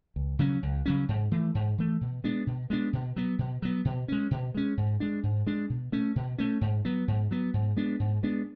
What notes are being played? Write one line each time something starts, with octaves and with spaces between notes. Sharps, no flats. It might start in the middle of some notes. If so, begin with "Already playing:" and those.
C#2
C#3 F#3 C#4
C#2
C#3 F#3 C#4
G#2
E3 A3
G#2
E3 A3
B2
G#3 B3 D4
B2
G#3 B3 D4
B2
F#3 B3
B2
F#3 B3
B2
G#3 C#4
B2
G#3 C#4
G#2
G#3 D4
G#2
G#3 D4
B2
A3 C#4
B2
A3 C#4
G#2
F#3 B3
G#2
F#3 B3
G#2
G#3 B3 D4
G#2
G#3 B3 D4